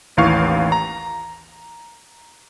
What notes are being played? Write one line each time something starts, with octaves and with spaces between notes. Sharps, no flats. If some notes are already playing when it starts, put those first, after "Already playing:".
A1 D#2 E3 F5 C#6
A#5